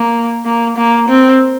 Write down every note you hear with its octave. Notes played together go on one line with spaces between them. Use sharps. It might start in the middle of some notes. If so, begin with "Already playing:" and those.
Already playing: A#3
A#3
A#3
C4